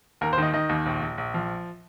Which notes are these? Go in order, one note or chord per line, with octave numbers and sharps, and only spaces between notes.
D#2 A#4
C5
D#3 D#5
D#3 D#5
D#2
A#1
A#1
A#1
F3